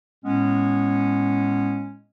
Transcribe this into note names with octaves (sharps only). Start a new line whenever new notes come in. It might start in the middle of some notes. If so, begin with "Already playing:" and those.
A2 G#3 B3 C#4